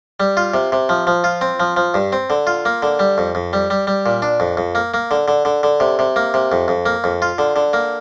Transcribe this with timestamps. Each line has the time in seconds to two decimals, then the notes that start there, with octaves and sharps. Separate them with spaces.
0.20 G3
0.37 F4
0.54 C3
0.72 C3
0.89 F3
1.07 F3
1.24 F4
1.41 C4
1.60 F3
1.76 F3
1.94 G2
2.13 C4
2.30 D3
2.47 F4
2.65 A#3
2.82 D3
2.99 G3
3.18 F2
3.35 F2
3.53 G3
3.70 G3
3.87 G3
4.06 A#2
4.22 D4
4.40 F2
4.57 F2
4.75 A#3
4.94 A#3
5.11 D3
5.28 D3
5.45 D3
5.63 D3
5.80 C3
5.99 C3
6.16 A#3
6.34 C3
6.52 F2
6.68 F2
6.86 A#3
7.04 F2
7.22 F4
7.38 D3
7.56 D3
7.73 A#3